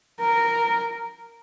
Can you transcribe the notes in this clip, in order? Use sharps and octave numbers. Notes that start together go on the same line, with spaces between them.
A#4